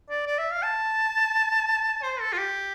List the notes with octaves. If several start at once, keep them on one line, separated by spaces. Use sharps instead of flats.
D5
D5
E5
F5
A5
C5
A4
F4
G4